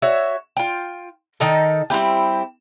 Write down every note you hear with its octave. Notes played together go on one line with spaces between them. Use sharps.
F#4 C#5 E5
F4 G5
D#3 D#4 A4
G3 C4 E4 G4